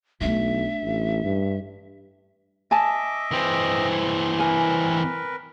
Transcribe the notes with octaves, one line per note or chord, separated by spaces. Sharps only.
B1 A3 D4 E5
A1
G2
D#5 E5 G#5 A5 D6
E3 C4
A#4 B4 G#5